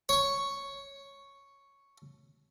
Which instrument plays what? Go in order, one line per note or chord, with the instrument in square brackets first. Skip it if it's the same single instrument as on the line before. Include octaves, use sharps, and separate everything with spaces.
[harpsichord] C#5 C#6